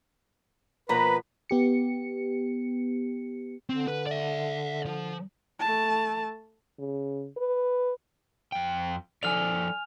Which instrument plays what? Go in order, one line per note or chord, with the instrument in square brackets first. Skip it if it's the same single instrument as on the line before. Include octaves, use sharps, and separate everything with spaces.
[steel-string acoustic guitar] B2 F3 A#3 [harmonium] B4 [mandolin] A#5 [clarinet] B5
[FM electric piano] B3 G4 C#7
[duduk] D3 [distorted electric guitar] C4
[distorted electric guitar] B4
D5 E5
F3
[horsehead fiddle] A3 A5
[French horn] C#3
B4
[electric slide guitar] F2 G5
[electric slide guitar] F3 A4 D5 [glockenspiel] G#5 F6 F7